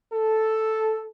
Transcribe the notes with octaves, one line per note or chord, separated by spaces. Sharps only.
A4